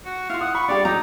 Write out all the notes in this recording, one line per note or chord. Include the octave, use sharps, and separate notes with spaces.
F#4
E4 F4 F5
F#5 D#6
B5 C#6
G3 D4 G4 D5 F5
F#3 D#4 A#5